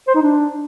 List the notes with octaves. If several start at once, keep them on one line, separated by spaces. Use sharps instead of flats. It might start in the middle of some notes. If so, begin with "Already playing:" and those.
C5
D#4
D4